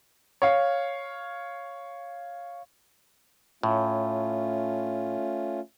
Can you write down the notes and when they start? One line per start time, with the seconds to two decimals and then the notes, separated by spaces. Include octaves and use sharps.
0.42 C#5 F5
3.63 A2 A3 C#4 F4